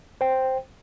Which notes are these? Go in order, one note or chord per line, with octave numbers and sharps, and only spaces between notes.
C5 G5